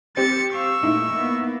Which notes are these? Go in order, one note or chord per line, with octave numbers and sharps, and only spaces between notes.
C4 G4 A6 C#7
F5 C#6 E6
A#2 A3 D#4 E4
A#3 B3